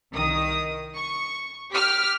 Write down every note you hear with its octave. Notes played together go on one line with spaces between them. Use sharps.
C2 D#3 D#6
C#6
G4 D6 F6 B6